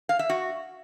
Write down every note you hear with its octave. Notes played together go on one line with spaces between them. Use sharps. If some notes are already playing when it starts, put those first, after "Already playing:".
F5
E5
F#4